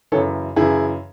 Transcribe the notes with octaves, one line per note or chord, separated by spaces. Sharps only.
F#2 C#3 E3 A4 C#5
F#2 C#3 E3 E4 G#4